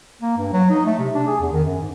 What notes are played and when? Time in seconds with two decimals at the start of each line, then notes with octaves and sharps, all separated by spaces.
0.21 A#3
0.38 G2
0.53 F#3
0.70 D#4
0.86 A3
0.99 C3
1.14 D4
1.27 G#4
1.40 E2
1.53 D#3
1.64 F#2
1.81 G#2